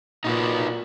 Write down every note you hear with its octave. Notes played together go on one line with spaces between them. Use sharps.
A#2 D#4 F#4 B4